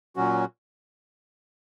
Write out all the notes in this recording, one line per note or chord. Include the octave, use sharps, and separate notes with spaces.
A#2 F#3 C#4 F#4